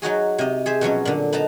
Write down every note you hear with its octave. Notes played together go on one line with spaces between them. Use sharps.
F#3 D#4 F#4 G#4
C3 D#5
G#4 C5 E5
B2 F3 F#3 C#4
A#2 D3
B3 D#4 A5 A#5